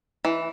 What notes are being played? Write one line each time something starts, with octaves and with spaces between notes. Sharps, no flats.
E3